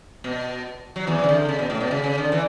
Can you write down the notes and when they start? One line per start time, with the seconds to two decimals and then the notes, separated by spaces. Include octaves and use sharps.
0.24 B2
0.96 F#3
1.07 E2 E3
1.24 C#3
1.29 D3
1.49 C#3
1.59 B2
1.70 A2
1.80 B2
1.91 C#3
2.04 C#3
2.18 D3
2.32 E3